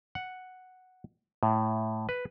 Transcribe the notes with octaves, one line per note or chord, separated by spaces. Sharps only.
F#5
A2
B4